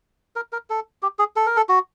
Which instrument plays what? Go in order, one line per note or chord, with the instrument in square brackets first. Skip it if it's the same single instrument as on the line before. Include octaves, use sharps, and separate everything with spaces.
[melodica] A#4
A#4
A4
G4
G#4
A4
A#4
A4
F#4